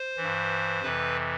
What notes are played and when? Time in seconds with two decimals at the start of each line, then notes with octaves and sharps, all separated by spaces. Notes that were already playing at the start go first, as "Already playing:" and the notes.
Already playing: C5
0.17 G2 E3
0.82 F2 C3 E3 B4